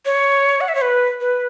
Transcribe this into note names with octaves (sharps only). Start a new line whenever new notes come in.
C#5
F#5
E5
C#5
B4
B4